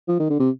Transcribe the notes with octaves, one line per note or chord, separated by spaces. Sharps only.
F3
D#3
D3
C3